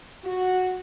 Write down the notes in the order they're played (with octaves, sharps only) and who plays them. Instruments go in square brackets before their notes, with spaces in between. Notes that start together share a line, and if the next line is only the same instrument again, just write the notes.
[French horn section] F#4